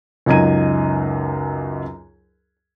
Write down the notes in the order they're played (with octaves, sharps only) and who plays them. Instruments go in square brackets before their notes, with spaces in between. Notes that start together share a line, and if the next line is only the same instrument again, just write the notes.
[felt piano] C#2 F#2 D#4 A#5 G#6 D#7